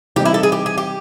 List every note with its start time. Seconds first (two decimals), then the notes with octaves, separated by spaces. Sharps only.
0.16 C3 E3 G3 C4 D#4 G4
0.25 E4
0.34 A4
0.43 G#4
0.52 G4
0.66 G#4
0.78 G4